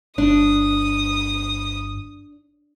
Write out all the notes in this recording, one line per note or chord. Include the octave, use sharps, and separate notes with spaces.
G1 D4 D#6